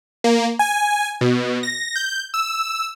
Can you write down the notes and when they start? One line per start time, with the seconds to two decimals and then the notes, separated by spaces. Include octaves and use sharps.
0.24 A#3
0.59 G#5
1.21 B2
1.63 A#6
1.96 G6
2.34 E6